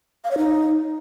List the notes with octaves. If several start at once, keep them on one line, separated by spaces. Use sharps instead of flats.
F5
C#5
D#4